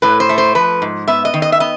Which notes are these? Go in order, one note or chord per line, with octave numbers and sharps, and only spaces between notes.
A2 B4
C5
A3
C5
F3 B4
G#2
B3 E5
D#5
D#3
D#5
E5
B3 D#5